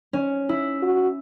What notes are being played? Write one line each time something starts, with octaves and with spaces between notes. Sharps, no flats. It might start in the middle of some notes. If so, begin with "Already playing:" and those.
C#4
E4
F#4